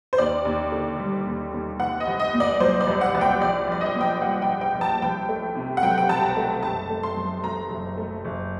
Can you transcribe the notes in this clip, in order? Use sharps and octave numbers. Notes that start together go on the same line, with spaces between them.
C5
D#2 D5
D#2
D3
G3
D#2
D#2
C2 F#5
D#5
C2
D#5
A#2
D5
F#3 C5
D5
C2
F#5
C2
G5
A#1 D5
A#1 D5
D#5
A#2
G5
G3 F#5
G5
A#1
G5
A#1
A5
C2 G5
A3
C3
F#5
F#3 G5
G5
C2 A5
A#5
A3
F#1 A5
A3
C6
F#2
F#3 A#5
F#1
A3
F#1